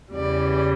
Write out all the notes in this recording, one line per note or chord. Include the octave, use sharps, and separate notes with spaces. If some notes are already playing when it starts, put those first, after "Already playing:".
E2 C#3 E3 G3 D5